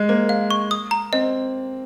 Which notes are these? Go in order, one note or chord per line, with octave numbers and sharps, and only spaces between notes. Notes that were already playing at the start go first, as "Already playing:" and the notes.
Already playing: G#3
A#3 C5
F5
C#6
D#6
A#5
C4 D#5